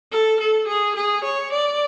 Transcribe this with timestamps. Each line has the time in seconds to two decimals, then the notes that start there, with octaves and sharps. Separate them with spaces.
0.12 A4
0.40 A4
0.68 G#4
0.95 G#4
1.24 C#5
1.52 D5